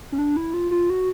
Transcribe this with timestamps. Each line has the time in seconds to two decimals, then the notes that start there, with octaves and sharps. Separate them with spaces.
0.12 C#4
0.18 D4
0.37 E4
0.54 F4
0.71 F4
0.90 F#4